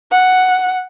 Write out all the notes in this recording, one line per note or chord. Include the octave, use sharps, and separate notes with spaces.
F#5